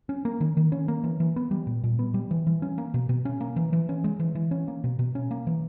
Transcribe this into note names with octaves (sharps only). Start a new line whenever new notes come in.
C#4
A#3
D#3
D#3
C#4
A#3
E3
E3
B3
G3
A#2
A#2
B3
G3
E3
E3
C#4
A#3
B2
B2
C#4
A#3
E3
E3
C#4
G#3
E3
E3
C#4
A#3
B2
B2
C#4
A#3
E3